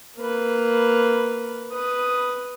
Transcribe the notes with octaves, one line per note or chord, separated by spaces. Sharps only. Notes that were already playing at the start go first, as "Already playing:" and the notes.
A#3 B4
B4 D#6